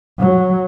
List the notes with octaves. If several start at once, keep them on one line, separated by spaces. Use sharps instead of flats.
F#3